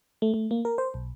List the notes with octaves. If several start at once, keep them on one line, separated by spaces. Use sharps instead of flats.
A3
A3
A#3
A#4
C5
B1